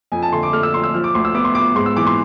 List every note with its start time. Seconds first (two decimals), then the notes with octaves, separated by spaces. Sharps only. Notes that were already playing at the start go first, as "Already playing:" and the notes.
0.12 F2 G#5
0.22 A5
0.32 D3 C6
0.43 D6
0.53 A3 F6
0.63 E6
0.74 F2 C6
0.84 E6
0.94 F3 F6
1.04 D6
1.14 D2 C6
1.25 E6
1.34 B3 D6
1.44 C6
1.55 B3 D6
1.76 G#2 C6
1.86 E6
1.96 E3 D6
2.06 C6